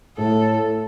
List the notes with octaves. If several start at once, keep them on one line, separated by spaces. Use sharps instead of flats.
A2 A4